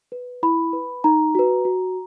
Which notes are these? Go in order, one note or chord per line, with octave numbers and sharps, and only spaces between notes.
B4
E4 B5
B4
D#4 A#5
F#4 B4
F#4